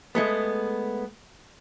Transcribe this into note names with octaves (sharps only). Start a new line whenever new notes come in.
G#3 A3 B3